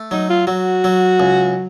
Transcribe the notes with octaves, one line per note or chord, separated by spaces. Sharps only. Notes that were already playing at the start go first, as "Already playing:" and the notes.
Already playing: A3
F#3 D#4
F4
F#3 F#4
F#3
C#2